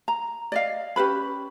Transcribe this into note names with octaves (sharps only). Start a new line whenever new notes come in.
A#5
D5 D#5 F5
C#4 G4 B4 B5